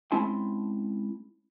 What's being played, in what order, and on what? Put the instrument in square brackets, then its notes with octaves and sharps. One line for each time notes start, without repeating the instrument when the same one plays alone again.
[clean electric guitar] G#3 C4 C#4 E4 A5 C6